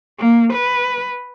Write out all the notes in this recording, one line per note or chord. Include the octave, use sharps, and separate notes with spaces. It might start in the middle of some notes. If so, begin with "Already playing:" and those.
A#3
B4